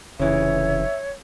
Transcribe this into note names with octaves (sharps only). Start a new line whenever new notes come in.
F1 C#3 E3 C#5 E5